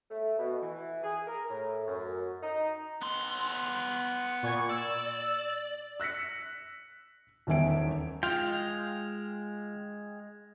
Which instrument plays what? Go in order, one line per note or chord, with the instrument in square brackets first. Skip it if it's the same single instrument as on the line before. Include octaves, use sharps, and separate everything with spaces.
[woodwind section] A3
B2
E3
G#4
A#4
A2
F#2
D#4
[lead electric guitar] B3 C6
[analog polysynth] A#2 C#6 G#6
[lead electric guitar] D5 [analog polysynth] E6
[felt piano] E6 F#6 A#6 B6 C#7
D#1 E2 D#3 E5 G#5 D7
[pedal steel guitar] G#3 F5 G5 [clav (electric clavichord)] F4